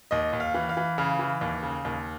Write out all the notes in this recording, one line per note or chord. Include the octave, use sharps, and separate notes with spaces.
D#2 D#5
D#2
F5
E3
F5
E3
C#3 F5
E3
D#2
C#3
D#2